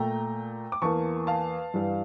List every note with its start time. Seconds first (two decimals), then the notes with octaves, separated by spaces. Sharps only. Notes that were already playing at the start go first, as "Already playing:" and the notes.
Already playing: A#2 A3 G5 A#5
0.72 D6
0.82 E2 E3 A#3 A5 C#6
1.27 F5 A5
1.74 G2 E3 G3